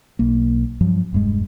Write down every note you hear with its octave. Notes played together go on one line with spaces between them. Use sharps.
B1 A#3
G2 F3 F#3
E1 G2 G#3